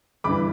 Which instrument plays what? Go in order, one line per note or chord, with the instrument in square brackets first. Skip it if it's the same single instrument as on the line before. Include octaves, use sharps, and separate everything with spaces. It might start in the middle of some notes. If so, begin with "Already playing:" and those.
[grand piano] G1 G2 E3 B5 D6